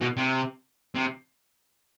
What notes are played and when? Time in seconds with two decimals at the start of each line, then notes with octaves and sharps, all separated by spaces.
0.01 B2
0.17 C3
0.95 C3